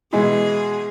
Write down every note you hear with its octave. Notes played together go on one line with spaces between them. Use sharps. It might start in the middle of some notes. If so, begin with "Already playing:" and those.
B2 E3 G#3 G#4